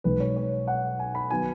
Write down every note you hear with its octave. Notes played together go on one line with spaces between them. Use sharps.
B1 B2 G#3 B4
C#5
C#5
F#5
G#5
B5
D#3 F#3 B3 G#5